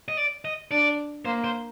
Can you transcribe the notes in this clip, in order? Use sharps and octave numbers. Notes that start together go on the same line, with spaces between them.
D#5
D5
D#5
D4 D5
A#3 C5
C5